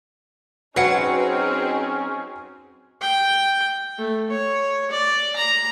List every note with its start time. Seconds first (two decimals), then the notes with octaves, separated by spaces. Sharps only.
0.76 F#3 C4 C#4 D#4 F#4 G#4 B4 F#5
3.01 G5
3.99 A3
4.30 C#5
4.91 D5
5.36 A#5